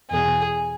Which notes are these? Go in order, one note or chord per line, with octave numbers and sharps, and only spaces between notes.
E2 B2 G#4